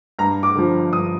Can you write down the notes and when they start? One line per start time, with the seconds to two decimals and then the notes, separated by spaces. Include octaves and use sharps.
0.19 G2 A#5
0.43 D6
0.55 D3 F3
0.92 G2 D#6